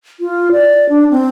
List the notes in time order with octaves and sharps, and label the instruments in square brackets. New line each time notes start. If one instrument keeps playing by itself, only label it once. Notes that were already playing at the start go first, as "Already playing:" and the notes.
[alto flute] F4
D5
D4
C4